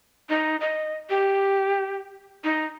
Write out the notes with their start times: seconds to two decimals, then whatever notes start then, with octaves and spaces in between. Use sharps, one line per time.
0.29 D#4
0.61 D#5
1.10 G4
2.44 D#4